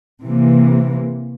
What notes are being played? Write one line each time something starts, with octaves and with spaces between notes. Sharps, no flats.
C3 E3 A#3